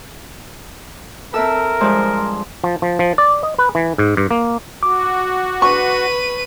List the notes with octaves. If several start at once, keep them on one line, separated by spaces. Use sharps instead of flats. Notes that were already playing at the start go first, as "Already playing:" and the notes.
C4 A4 A#4 E5 E6
G2 F3 G#3 C5
F3
F3
F3
D5
D#5
B4
E3
G#2
G2
A#3
F#4 D6
B4 C#6 D#7